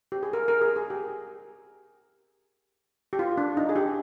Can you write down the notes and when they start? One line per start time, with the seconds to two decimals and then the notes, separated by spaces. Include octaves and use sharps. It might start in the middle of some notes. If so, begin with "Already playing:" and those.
0.12 G4
0.23 G#4
0.33 A#4
0.48 A#4
0.61 G#4
0.76 G#4
0.90 G4
3.13 G4
3.19 F4
3.38 D4
3.57 D#4
3.69 G#4
3.76 G4